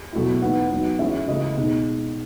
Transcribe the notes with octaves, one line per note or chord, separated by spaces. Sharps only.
B2 F#3 A3 E4
E3 B3 D#4 F#5
F#3 B3 D#4
E3 G#3 C#4 E4 E5
C#3 E3 A3 D#5
B2 G#3 D#4